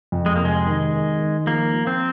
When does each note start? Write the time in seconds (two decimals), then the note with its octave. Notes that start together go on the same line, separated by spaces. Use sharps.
0.12 F2
0.26 G#3
0.36 C3 A#3
0.45 G#3
0.66 D#3
0.93 D#3
1.20 D#3
1.47 F3 A#3
1.73 F3
1.87 C4